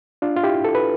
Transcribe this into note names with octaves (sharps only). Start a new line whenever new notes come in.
D4 F4
F4
E4 G4
A4
B4